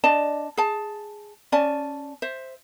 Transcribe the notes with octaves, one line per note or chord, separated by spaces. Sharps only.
D4 D5 D#5 A5
G#4 A5
C#4 D5 G#5 A5
C5 E5